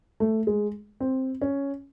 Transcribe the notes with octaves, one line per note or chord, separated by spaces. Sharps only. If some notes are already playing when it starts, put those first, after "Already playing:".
A3
G#3
C4
C#4